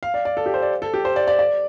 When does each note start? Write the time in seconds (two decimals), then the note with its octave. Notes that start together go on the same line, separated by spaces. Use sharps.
0.03 F5
0.14 D5
0.25 D5
0.37 A4
0.46 G4
0.54 C5
0.62 D5
0.82 A4
0.94 G4
1.05 C5
1.16 D5
1.28 D5
1.39 D5